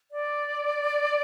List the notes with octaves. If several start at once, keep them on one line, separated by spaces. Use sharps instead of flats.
D5